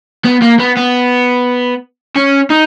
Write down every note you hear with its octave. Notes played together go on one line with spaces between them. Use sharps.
B3
A#3
B3
B3
C#4
D#4